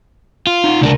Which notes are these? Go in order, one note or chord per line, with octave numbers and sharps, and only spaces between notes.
F4
D#4 F5 F#5
C#2 C3 D4 A#4